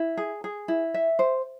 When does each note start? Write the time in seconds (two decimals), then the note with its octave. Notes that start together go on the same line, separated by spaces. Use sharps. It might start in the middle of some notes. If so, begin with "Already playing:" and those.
Already playing: E4
0.17 G#4
0.44 G#4
0.68 E4
0.94 E5
1.19 C5